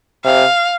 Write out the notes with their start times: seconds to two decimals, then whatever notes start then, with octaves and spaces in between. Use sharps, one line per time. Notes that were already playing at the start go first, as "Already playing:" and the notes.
0.24 C3 F5